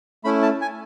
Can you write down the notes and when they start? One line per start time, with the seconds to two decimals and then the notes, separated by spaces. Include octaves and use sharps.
0.24 A3 C#4 E4 B5
0.42 A5
0.61 G#5